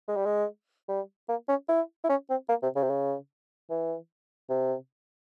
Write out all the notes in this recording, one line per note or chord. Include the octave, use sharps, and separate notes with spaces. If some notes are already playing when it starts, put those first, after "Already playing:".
G#3
G3
G#3
G3
A#3
C#4
E4
E4
C#4
C4
A#3
C3
C#3
C3
C#3
E3
C3